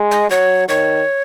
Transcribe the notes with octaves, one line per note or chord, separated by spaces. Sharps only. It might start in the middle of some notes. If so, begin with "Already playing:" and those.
Already playing: G#3
D#5
F#3 C#5
D#3 C#5